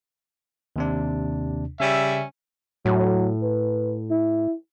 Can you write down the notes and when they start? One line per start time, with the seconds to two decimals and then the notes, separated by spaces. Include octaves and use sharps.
0.76 D#2 C3 D4
1.80 C#3 G3 C#4 E5
2.85 A2 F#3
3.42 B4
4.11 E4